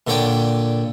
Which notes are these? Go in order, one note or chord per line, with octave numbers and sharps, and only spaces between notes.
A#2 D3 C#5 D5 G5